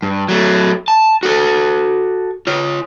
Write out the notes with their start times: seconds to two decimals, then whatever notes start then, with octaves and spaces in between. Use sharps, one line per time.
0.02 G2
0.29 F#3 A3
0.88 A5
1.23 F#4 A4
2.47 F4 C#5